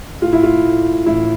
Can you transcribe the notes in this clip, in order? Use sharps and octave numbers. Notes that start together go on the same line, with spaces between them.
A2 F4
E4
F4
A2
A1 E4